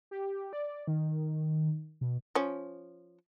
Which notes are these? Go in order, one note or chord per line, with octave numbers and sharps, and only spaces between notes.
G4
D5
D#3
B2
F3 C#4